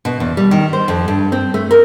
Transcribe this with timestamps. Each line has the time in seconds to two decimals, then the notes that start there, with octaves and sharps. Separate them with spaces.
0.05 B2
0.20 E2
0.37 G3
0.51 D#3
0.73 C5
0.88 F2
1.08 G2
1.32 C4
1.54 A3
1.71 A#4